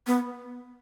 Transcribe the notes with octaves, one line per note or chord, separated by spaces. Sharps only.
B3